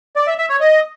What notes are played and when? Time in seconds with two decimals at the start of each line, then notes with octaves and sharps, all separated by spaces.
0.16 D5
0.27 E5
0.38 E5
0.49 C#5
0.60 D#5